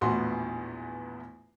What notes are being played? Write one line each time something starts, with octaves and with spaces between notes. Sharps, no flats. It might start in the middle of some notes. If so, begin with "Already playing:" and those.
A#1 E2 A2 B3 F#4 C6